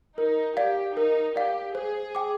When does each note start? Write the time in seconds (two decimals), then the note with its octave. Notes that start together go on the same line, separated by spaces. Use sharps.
0.18 D#4 A#4
0.57 G4 D5 F5
0.96 D#4 A#4
1.35 G4 D5 F5
1.75 G#4 C5
2.15 G5 D6